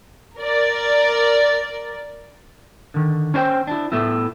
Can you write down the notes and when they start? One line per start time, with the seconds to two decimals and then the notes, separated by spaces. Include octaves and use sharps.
0.38 A#4 D5
2.94 D3 D#3
3.34 C#4 D4 C5 G5
3.67 D4 E4
3.92 A2 A3 B3 E4